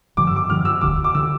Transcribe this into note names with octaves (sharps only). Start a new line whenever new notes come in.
G2 D3 F3 D6
E6
D6
G2 D3 F3 F6
E6
E1 D2 D3 D6
D6
D3 E6